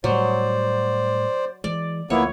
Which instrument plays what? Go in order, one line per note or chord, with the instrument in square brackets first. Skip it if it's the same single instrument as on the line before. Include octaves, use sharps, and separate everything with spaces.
[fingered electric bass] A2 G3 [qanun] F#3 [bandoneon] C5 D5
[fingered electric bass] E3 G#3 [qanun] D5
[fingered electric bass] D2 F3 [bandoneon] A#3 B3 E4 [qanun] C#5